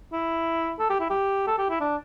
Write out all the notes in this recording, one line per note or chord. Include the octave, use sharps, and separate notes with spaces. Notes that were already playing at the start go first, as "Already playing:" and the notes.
E4
A4
G4
E4
G4
A4
G4
E4
D4